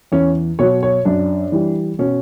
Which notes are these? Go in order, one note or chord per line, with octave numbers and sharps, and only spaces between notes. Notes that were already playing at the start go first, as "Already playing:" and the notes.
E2 C#4
B2 F#3 C#5
C#5
F#2 D4
E3 G3
B2 C#4